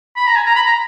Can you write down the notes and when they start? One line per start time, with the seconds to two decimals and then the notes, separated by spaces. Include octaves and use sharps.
0.16 B5
0.27 A#5
0.36 G#5
0.46 A#5
0.55 B5
0.66 A#5